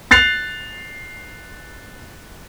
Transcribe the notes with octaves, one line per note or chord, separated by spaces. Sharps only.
F#6 A6 C7 F7